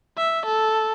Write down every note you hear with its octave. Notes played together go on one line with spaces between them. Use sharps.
E5
A4